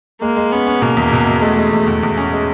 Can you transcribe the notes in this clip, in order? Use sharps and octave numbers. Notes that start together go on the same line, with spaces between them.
G#3 A#3
G#3
B3 C#4
C#4
B2 A#3
E2
B2
B2
G#3 A3
G#3
E2
E2
E2
C#4
G#3